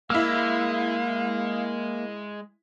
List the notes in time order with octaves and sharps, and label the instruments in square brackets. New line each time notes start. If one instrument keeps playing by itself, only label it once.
[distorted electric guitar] G#3 [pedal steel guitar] A#3 [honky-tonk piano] E4 E6 [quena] F5